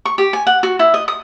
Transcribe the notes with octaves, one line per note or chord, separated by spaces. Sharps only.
C#6
G4
G#5
F#5
F#4
E4
D#5
D#6